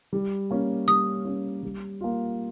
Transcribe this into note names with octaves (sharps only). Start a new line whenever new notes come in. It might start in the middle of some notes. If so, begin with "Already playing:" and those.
G3
A#3 C#4
G3 D#6
A#3 C#4
G3
A#3 F4